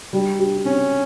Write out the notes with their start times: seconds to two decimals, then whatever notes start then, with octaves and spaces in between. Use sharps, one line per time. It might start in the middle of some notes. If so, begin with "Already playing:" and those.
0.13 G3
0.39 G4
0.65 C4 C#4